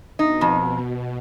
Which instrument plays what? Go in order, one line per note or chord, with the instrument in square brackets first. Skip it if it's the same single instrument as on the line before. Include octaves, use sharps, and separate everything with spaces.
[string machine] B2 [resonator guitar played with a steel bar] D#4
[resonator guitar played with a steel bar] F2